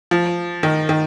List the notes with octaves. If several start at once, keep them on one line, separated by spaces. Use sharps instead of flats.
F3
D#3
D#3